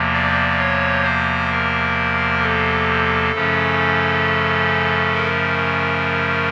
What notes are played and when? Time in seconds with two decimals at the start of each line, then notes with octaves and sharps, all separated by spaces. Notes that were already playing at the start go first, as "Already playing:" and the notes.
Already playing: E2 C3 F3 A#3
0.13 D5
0.58 C#5
1.04 C5
1.50 A#4
2.41 A4
3.31 F#2 C#3 F3 A3 C#4
5.14 A#4